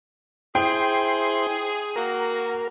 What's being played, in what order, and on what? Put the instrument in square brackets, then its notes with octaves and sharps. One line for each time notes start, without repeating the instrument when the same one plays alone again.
[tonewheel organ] E4 C5 C6 [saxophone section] G#4 [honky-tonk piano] G5
[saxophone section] A#3 F#4 [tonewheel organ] A#4